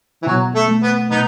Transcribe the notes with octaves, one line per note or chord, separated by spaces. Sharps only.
E3
B2 F#3
A3
A3
B3
B2 B3 D#4